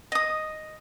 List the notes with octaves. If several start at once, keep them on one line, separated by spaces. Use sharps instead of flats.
D#5 D#6